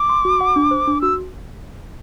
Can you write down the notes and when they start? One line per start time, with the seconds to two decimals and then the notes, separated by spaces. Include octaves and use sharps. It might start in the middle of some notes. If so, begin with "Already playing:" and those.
Already playing: D6
0.09 C6
0.25 F#4
0.41 F#5
0.56 D4
0.71 C5
0.87 D4
1.02 F#4 E6